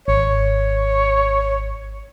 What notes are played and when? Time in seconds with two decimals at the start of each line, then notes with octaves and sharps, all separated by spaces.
0.08 G#1 C#5